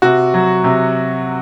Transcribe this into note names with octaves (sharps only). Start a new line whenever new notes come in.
C3 F#4
F#3
C3